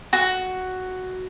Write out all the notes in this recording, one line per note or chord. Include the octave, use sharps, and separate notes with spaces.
F#4